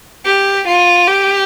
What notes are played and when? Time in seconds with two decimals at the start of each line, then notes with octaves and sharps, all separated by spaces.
0.26 G4
0.67 F4
1.08 G4